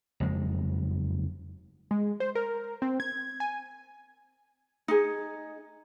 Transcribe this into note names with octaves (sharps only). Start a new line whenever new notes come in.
F#1 F2 G#3
G#3
C5
A#4
C4
G#6
G#5
D#4 G#4